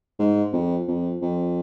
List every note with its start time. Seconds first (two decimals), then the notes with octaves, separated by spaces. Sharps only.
0.19 G#2
0.53 F2
0.88 F2
1.22 F2